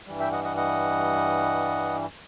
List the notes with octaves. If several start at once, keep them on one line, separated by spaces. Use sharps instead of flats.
G2 E3 G3
E5 G5
D#5 F#5
D#5 F#5
D#5 F#5